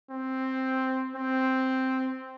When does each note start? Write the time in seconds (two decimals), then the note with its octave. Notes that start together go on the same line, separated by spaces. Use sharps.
0.11 C4
1.16 C4